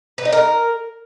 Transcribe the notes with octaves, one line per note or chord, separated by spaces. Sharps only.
B4
D#4
A#4